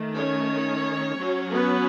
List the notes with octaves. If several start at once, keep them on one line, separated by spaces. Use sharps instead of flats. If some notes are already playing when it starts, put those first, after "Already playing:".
Already playing: D#3 A3
C#4 C#5
F#3 C#4
B3 B4